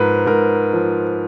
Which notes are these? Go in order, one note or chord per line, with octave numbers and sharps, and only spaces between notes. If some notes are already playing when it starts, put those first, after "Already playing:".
Already playing: G#2 F3 A#4 B4
G#2 A#4
F3